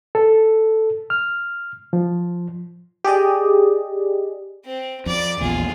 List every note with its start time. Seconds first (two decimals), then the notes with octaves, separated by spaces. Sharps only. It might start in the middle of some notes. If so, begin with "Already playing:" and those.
0.15 A4
1.10 F6
1.93 F3
3.04 G4 G#4 D5 D#5
4.65 C4
5.06 F2 D5
5.40 A#1 E2 A#2 F4 G#4